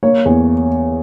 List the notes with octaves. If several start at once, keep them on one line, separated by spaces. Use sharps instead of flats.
A#3 C#5
E2